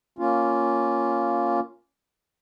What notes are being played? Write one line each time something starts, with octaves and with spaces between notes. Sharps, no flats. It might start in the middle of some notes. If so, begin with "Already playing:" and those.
A#3 C#4 F4